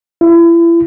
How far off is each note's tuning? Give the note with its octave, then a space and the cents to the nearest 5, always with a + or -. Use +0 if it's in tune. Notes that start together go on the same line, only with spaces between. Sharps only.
E4 +35